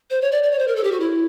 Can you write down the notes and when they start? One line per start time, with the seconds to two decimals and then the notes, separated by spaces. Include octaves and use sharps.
0.10 C5
0.21 C#5
0.31 D5
0.43 D5
0.51 C#5
0.59 C5
0.68 A#4
0.76 A4
0.84 G4
0.92 F#4
1.00 E4